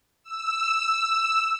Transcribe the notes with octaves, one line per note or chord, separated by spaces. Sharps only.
E6